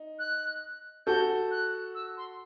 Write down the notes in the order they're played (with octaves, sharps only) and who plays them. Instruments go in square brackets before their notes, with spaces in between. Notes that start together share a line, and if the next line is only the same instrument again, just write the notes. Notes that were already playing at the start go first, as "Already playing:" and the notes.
Already playing: [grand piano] D#4
[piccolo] F#6
[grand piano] F#4 A4 [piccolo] G6
[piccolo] F#6
E6
C6